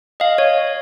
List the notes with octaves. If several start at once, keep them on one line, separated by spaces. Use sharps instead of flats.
D#5 F5
C#5